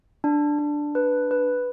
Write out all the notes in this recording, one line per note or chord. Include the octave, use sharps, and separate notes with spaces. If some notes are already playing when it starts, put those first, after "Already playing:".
D4
D4
B4
B4